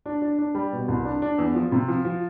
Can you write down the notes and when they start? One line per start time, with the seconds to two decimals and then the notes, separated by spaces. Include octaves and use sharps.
0.06 D4
0.22 D4
0.38 D4
0.55 G3
0.72 B2
0.88 C2
1.05 D4
1.22 D4
1.38 E2
1.55 F3
1.72 C3
1.88 F3
2.05 F3